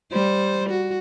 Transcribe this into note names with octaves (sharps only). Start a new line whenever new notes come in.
G3 C5
F#4